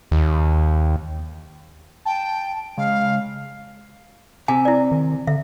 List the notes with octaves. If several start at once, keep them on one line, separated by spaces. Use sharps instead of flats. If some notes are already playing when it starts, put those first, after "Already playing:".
D#2
G5 A5
C#3 G#3 F5
C3 G#5
E4 D5
D#3
D3 E5